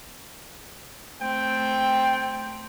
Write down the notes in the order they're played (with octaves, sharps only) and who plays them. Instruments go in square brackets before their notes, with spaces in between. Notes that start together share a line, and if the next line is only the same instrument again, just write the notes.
[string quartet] A3 C4 [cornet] G5